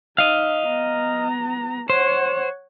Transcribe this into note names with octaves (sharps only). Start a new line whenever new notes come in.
D#4 D#5 F5
B3 A#5
C5 C#5 F#5